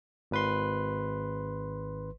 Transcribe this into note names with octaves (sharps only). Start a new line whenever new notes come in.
G#1 B4 C6